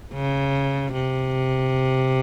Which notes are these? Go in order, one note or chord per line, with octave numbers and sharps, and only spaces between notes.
C#3
C3